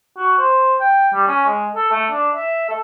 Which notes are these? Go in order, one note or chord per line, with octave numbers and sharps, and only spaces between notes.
F#4
C5
G5
G3
C#4
G#3
A4
A3
D4
E5
A4